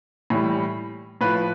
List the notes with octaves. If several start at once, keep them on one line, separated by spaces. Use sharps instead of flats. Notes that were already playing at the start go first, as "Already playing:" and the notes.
A2 E3 G3
A2 F3 B4